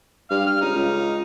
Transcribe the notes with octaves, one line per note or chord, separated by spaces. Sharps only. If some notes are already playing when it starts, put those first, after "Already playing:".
G2 F5
F6
C#2 D#4
C#2